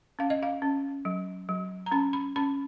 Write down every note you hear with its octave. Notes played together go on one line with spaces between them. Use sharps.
C#4 F5
D#5
F5
C#4
F#3
F#3
A#5
C#4 B5
B5
C#4 B5